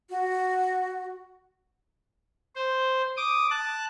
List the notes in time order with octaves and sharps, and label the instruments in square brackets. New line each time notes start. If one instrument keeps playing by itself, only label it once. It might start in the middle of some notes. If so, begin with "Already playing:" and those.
[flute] F#4
[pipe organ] C5
D6 D#6
A5 F#6